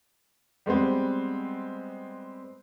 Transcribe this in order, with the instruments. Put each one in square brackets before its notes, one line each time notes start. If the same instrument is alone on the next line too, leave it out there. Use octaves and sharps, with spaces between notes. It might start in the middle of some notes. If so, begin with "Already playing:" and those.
[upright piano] G3 G#3 B3 C4